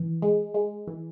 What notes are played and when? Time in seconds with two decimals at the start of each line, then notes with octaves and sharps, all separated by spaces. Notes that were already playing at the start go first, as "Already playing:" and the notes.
Already playing: E3
0.22 G#3
0.54 G#3
0.88 E3